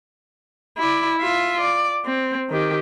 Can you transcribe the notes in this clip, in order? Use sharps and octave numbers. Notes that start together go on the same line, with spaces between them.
E4 D5
F4 E5
D5
C4
D#3 G4